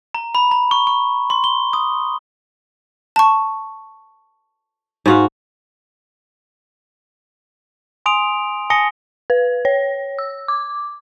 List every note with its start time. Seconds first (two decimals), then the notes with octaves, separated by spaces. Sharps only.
0.15 A#5
0.35 B5
0.51 A#5
0.71 C#6
0.87 C#6
1.30 C6
1.44 G7
1.73 D#6
3.16 A5 C#6
5.06 G#2 F#4 F5
8.06 G#5 C6 D#6 D7 F7
8.70 G#5 A5 D#6 A#6 C#7 G7
9.30 B4
9.65 C#5
10.19 E6
10.48 D6